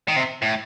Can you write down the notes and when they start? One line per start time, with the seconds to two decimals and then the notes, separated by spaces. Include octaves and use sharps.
0.08 D#3
0.16 C3
0.42 A2